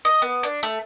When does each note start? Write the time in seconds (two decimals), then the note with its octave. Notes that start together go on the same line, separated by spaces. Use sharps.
0.05 D#5
0.22 B3
0.43 D4
0.63 A3